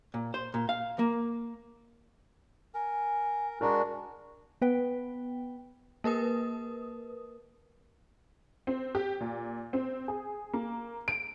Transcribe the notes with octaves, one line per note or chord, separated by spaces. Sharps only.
A#2
C5
A#2
F5
A#3
A#4 G#5
G#3 D4 F#4 A#4 D5 A#5
B3 B4 G5
A#3 A#4 B4 D#6
C4
G4
A#2
C4
G#4
A#3
D7